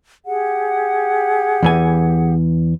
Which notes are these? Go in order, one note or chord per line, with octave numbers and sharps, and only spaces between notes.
G4 G#4 F#5
E2 E3 G#5